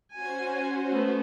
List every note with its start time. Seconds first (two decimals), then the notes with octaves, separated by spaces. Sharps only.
0.13 C#4 F#4 C5 G#5
0.92 A3 B3